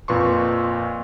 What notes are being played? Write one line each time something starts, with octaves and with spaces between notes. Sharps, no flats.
F2 A#2 B4 C6 C#6